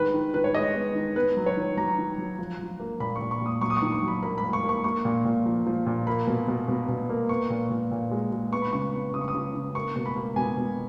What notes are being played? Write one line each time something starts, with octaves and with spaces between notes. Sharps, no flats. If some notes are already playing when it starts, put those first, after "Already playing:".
Already playing: D#3 G#3 B4
D#3
D#3 B4
C#5
G#3 D#5
B3
D#3
B3 B4
F#3
C#5
D#3
F#3 A#5
D#3
F#3
F3
F3
A#3
A#2 B5
C#6
A#2
C#6
A#2
D#6
F#3 C#6
D#6
C#6
D#3
C#6
F#3
B5
A#3 B5
B5
A#3
C#6
A#3
C#6
A#3 C#6
A#2
A#2
F3
F3
A#2
A#3 B5
B2
B2
B2
B2
A#3
B3 C#6
A#2
A#2
A#2
G#3
G#3
B3 C#6
B5
C#3 C#6
B3
C#3 D#6
C#6
D#6
C#3
C#3
A#3 C#6
B2
B5
A#3
B2 G#5
B2